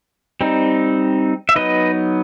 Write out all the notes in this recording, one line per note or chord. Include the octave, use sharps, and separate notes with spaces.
G3 C4 D#4
E5
F#3 B3 D#4 B4 D#5